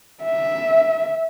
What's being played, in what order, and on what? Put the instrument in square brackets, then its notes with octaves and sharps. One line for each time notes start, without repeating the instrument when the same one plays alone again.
[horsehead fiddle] E5